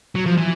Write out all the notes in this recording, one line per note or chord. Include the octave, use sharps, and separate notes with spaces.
F#3
F3
E3